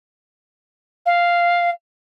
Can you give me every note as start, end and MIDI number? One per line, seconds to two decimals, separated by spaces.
1.06 1.70 77